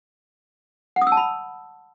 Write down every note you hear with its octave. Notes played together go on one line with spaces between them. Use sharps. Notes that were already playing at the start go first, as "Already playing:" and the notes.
F#5
D#6
E6
A5
B5